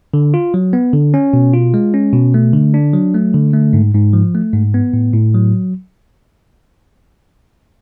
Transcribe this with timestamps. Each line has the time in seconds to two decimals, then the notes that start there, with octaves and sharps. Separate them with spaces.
0.14 D3
0.34 F4
0.54 F#3
0.73 B3
0.93 D3
1.14 C#4
1.33 B2
1.53 F4
1.74 G#3
1.94 C#4
2.13 B2
2.34 A3
2.53 D3
2.74 D4
2.93 F#3
3.14 A3
3.34 D3
3.54 A3
3.73 G#2
3.94 G#2
4.13 F3
4.35 A3
4.53 G#2
4.74 B3
4.93 A2
5.14 A2
5.35 F#3